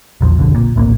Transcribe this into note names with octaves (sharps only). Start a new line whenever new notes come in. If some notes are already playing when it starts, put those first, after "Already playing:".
A#1 E2 F3
F#1 B1 F2 D3
A#2
D1 A#1 C3 A#3